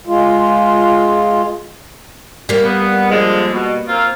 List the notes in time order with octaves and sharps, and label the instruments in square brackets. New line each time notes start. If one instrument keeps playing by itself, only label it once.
[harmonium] G#3 F4
[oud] G3 A#3
[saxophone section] B3
D3 F3 G#3
B2
A#3 C4 F4